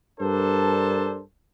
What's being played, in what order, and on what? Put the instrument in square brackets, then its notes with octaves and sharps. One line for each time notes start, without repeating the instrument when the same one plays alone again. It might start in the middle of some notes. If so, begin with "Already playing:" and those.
[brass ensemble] G2 D4 A4 A#4 C5 A5